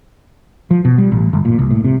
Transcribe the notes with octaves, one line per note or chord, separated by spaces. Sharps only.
F3
B2
G3
A1
G1
A#2
C2
A2
C3